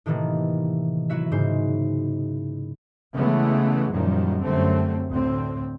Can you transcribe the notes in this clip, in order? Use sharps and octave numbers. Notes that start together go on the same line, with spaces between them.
A2 C3 D#3 E3 A3 A#3
F#3 E4 F#4 E5
G#2 C#3 C5
C#3 E3 G#3 A3 B3
F#2 A#2 D#3 F3 G3
F#2 D3 G3 A3 C4
D2 A2 D3 C4